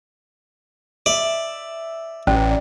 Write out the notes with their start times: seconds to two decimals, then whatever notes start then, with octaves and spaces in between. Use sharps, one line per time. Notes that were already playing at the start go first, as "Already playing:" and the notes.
1.06 D5 E5
2.27 A1 C#4 D5